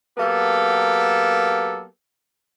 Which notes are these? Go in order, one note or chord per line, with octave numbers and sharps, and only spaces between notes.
F#3 A#3 B3 G4 A4